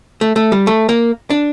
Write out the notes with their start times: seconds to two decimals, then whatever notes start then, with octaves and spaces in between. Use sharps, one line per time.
0.21 A3
0.36 A3
0.52 G3
0.67 A3
0.89 A#3
1.30 D4